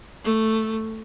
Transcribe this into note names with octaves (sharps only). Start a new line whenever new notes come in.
A3